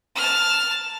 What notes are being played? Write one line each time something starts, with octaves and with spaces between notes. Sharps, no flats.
A5 F6